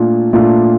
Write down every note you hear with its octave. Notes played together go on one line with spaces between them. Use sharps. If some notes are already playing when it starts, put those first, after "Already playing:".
Already playing: A#2 A3 D4 F4
A#2 A3 D4 F4